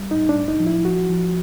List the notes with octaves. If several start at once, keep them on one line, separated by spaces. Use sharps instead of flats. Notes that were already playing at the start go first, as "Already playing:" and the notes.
Already playing: G3
A2 D#4
D4
A2
D#4
F3
E4
F3 F#4
F3